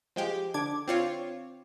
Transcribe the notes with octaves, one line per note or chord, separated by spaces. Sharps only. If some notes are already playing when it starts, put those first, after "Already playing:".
F3 G#3 G4
D3 D4 D6 G#6
C4 F4 C#5